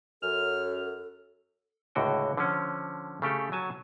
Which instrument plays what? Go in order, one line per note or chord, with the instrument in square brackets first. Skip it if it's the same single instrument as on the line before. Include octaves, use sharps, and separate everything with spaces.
[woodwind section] F#2 [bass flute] A4 [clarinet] F6
[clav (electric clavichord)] C#2 A2 D3 F#4 G5
D3 F3 C#4
C#3 A3 G4 A4
F#3 G#5 A5